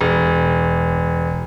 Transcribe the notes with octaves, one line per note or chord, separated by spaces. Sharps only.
E1